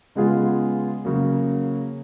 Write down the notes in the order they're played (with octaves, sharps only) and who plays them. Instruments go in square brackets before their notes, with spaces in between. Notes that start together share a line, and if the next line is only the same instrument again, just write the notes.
[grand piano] C#3 G#3 B3 F4 G#4
C#3 F#3 A#3